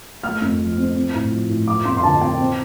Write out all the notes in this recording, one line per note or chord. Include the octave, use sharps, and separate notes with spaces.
A3 F6
F2
F3
C4
C4
A2
F3
A2
F3 D6
F2 C6
C6
D3 A5
C4 G5
C4